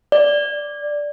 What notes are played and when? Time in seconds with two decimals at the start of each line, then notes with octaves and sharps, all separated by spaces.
0.12 D5